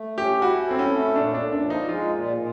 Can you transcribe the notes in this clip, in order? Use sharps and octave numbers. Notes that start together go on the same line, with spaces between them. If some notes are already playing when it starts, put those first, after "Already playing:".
Already playing: A3
C#4 G4
E4 F#4
C4 A4
C#4
A3
A#2 D4
D4
A#2
D4
F3
D#4
G#3 F4
A#2
A#2